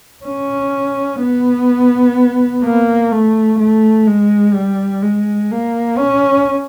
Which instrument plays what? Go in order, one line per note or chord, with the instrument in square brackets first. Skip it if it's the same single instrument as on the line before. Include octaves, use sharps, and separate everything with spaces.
[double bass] C#4
B3
A#3
A3
A3
G#3
G3
G#3
A#3
C#4